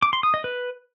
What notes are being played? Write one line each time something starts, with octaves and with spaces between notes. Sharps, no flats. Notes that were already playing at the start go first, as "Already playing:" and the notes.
D6
C6
D#6
D#5
B4